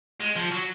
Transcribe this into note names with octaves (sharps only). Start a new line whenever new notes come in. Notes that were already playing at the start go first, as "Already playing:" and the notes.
G#3
F3
F#3